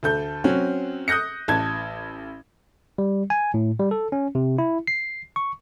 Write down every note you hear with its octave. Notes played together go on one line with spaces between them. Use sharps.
D2 A4 G6
F#3 C4 C#4 F#4
D#6 F#6 G6 A#6 C#7
A1 A5 G#6
G3
G#5
A2
G3
A4
C#4
C3
E4
C7
C#6